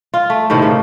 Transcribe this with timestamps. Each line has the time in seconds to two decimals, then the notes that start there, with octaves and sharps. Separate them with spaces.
0.14 F4
0.30 A3
0.50 A2 C3 D#3
0.62 C#3